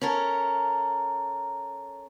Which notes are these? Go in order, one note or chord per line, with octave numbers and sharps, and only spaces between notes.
C#4 A4 A#4